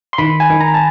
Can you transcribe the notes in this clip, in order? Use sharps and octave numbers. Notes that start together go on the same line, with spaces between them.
C6
D#3 B5
G#5
D#3
A#5
A5